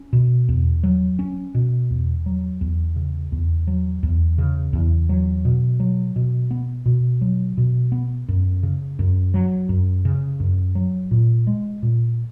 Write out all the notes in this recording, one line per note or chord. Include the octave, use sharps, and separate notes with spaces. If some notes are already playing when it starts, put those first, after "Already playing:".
Already playing: C#4
B2
E2
F#3
C#4
B2
E2
F#3
E2
C#3
E2
F#3
E2
C#3
E2
F#3
B2
F#3
B2
B3
B2
F#3
B2
B3
F#2
C#3
F#2
F#3
F#2
C#3
F#2
F#3
A#2
G#3
A#2